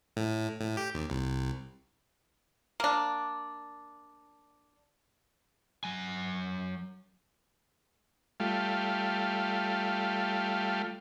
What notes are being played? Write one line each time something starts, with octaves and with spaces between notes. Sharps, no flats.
A2
A2
G4
D#2
C2
A#3 D4
F#3 G#5
G3 A3 F4